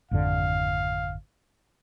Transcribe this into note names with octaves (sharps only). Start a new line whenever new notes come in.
G#1 F2 D3 F5